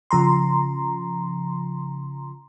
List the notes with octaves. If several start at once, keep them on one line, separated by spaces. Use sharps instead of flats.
C#3 F3 A#5 C6